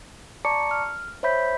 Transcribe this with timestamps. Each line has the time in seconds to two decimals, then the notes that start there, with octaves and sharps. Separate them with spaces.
0.45 D5 A5 A#5 C#6 D6 C#7
0.71 F6
1.23 C5 C#5 E5 B5 G6 B6